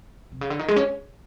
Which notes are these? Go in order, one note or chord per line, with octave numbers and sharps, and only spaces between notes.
C3
C#3
D3
D#3
G#3
C#4